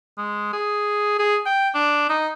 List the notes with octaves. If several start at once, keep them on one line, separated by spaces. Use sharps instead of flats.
G#3
G#4
G#4
G5
D4
D#4